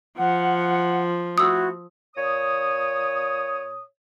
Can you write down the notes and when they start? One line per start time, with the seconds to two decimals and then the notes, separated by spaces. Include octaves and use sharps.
0.18 F3 F#5
1.38 A3 E4 F#4 D#6 E6
2.16 A#2 C#5 D#6